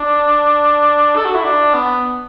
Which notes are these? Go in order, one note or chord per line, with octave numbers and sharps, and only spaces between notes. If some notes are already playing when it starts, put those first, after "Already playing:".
Already playing: D4
A4
F#4
E4
D4
B3